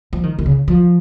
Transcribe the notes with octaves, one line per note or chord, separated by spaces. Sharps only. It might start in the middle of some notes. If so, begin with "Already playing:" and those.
F3
D#3
D#3
C#3
F3